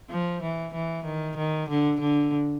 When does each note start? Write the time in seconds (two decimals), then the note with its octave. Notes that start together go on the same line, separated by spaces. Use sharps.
0.10 F3
0.43 E3
0.74 E3
1.05 D#3
1.37 D#3
1.69 D3
2.00 D3